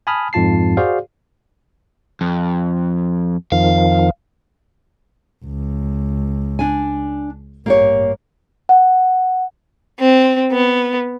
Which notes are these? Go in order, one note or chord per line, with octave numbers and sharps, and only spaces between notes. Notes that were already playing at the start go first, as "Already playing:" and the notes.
G#5 A5 B5 D#6 F6
F2 G#2 F4 A5 C7
F#4 G#4 C5 D5 F5
F2
F2 D#3 F3 F5
C#2
D4 G#5
A1 G2 A#3 G4 C#5
F#5
C4
B3